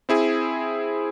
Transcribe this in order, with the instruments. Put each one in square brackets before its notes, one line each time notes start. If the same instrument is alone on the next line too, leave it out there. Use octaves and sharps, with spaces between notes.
[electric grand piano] C4 E4 G#4